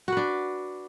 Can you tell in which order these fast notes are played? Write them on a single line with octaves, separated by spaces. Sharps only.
F#4 B4 D4